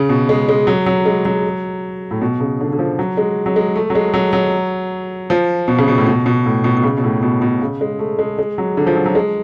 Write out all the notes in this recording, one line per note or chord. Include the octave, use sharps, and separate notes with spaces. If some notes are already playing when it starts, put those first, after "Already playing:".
Already playing: C#3
B2
G#3
G#3
F#3
F#3
G#3
F#3
A2
B2
C#3
D3
D3
F3
F#3
G#3
F#3
G#3
A3
F#3
G#3
F#3
F#3
F3
B2
C#3
B2
A2
B2
B2
A2
B2
B2
C#3
B2
A2
B2
B2
C#3
G#3
A3
G#3
G#3
F#3
D3
F3
F#3
F#3
G#3